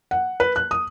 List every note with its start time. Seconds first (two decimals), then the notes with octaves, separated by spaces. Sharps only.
0.11 F#5
0.40 B4
0.56 F#6
0.71 D#6